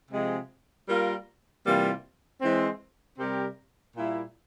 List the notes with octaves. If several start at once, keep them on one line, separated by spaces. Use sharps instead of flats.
C3 F3 G#3
G3 A#3 F4 A#4
C3 E3 G3 A#3 F4
E3 G#3 C4
C3 G3 C4 G4 A#4
A#2 G3 A#3 E4